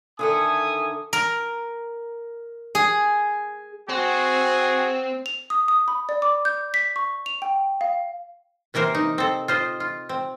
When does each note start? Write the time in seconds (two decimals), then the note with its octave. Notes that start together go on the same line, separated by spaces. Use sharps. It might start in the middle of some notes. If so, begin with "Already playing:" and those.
0.19 D3 D#3 A4 E5 G#5 D#6
1.13 A#4
2.75 G#4
3.89 C4 F#4 G#4
5.26 F7
5.50 D#6
5.68 D#6
5.88 B5
6.09 D5
6.22 D6
6.45 G6
6.74 B6
6.96 C#6
7.26 F7
7.42 G5
7.81 F5
8.74 C3 E3 A#3 A#4 C5
8.95 D#4
9.18 C4 A4
9.48 F4 C5 D#5
9.80 F4
10.09 C4